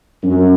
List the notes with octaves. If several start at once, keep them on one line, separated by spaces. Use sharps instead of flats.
F#2